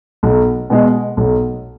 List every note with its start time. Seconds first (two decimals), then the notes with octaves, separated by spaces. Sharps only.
0.23 B1
0.70 B2 G#3
1.17 B1